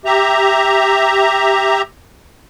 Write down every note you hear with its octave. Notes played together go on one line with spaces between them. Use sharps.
G4 E5 A#5